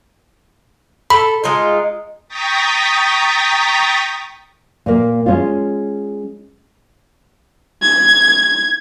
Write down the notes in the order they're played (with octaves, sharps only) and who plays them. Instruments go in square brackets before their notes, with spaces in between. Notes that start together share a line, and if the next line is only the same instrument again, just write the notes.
[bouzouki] A4 [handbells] B5
[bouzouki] G#3 D#4 F4
[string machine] G5 A#5 C#6 D#6 A6 B6
[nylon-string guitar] A#2 A#3
G#3 C#4 F4
[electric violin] G#6